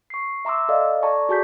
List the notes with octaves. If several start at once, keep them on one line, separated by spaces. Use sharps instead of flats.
C#6 C7
E5 A#5 C6 D6 E6
A4 D5 D#5 F5
A4 D5 A5 A#5 C#6
F#4 G#4 A5 G6 B6